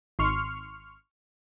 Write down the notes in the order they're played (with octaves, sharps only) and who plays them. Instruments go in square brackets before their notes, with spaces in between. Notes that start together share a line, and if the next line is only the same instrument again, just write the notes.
[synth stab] G#1 C6 C#6 F6